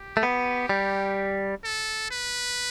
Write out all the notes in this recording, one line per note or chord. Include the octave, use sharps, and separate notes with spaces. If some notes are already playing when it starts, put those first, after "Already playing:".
Already playing: G4
A3
B3
G3
A4
B4